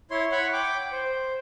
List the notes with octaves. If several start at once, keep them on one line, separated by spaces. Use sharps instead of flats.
E4 C#5 C6
C#5 F#5 B5 C#6
G5 D6
C5